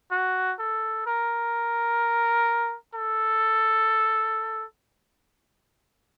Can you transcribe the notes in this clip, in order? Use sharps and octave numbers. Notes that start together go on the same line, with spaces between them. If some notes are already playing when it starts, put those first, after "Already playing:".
F#4
A4
A#4
A4